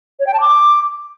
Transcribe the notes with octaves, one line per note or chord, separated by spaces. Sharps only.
C#5
G5
A5
D6